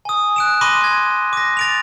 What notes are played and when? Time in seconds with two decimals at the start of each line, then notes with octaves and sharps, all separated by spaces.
0.05 G#5 D#6
0.36 F#6 D7 E7
0.61 B5 C6 D6 A#6 D#7
0.84 G#6
1.33 D6 A#6
1.57 A6 D7 F7